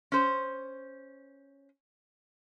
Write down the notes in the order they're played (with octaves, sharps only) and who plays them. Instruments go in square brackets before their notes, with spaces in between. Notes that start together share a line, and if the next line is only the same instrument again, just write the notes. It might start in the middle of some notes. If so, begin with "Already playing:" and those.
[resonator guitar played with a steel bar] C#4 C5